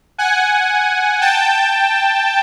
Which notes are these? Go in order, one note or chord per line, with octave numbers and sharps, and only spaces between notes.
F#5 G#5
G5 A5